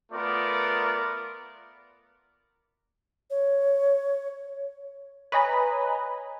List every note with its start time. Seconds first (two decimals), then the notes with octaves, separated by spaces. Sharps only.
0.12 A3 B3 F4 A#4 D5
3.30 C#5
5.32 B4 C#5 D#5 G#5 A#5 B5